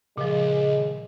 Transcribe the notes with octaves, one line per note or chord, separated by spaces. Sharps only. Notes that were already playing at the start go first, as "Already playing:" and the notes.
C#2 A#2 F3 G#3